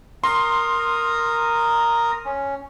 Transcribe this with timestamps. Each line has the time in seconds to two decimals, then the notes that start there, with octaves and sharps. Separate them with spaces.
0.24 A#4 A#5 C6 D#6
2.25 C#4